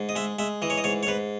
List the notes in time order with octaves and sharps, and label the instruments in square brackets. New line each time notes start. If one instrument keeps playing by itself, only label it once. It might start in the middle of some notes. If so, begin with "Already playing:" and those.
Already playing: [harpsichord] G#2
D#5
G#3 E5
G#3 E5
E3 D#5
C#5
D#5
G#2 C#5
C#5
G#2 B4